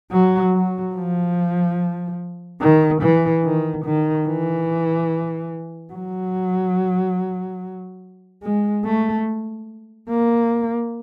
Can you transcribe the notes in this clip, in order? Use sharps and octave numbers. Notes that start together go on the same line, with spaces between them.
F#3
F#3
F3
D#3
E3
D#3
D#3
E3
F#3
G#3
A3
A#3